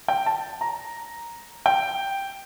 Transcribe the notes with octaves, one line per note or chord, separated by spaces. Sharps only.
G5
A5
A#5
G5